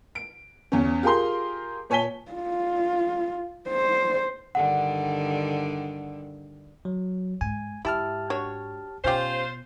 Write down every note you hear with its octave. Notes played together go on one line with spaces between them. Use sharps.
D7
E2 C#4
F4 G4 G#4 A#4 A#5 C6
A#2 C#5 G#5 A5 B6 G7
F4
C5
G2 D3 D#3 F#5
F#3
G#2 G#5
G#2 E4 G4 A5 F6
D4 F#4 C#5
B2 C#4 F4 G4 C5